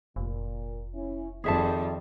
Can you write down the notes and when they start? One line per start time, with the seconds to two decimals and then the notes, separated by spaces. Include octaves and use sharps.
0.16 F1 A#2
0.94 C#4 E4
1.44 F2 D#3 G3 C4 G#4 A4 E5 A5